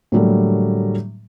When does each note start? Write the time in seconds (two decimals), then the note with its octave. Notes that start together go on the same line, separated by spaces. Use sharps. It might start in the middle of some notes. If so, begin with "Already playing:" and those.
0.12 A2 D3 F#3 G3 A3 A#3